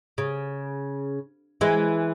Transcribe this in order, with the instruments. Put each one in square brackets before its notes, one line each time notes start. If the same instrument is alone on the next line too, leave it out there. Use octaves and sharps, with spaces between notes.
[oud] C#3
E3 G#3